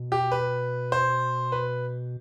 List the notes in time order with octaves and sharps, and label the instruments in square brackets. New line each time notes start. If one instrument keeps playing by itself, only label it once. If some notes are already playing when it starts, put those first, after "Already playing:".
Already playing: [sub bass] B2
[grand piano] G4
B4
C5
B4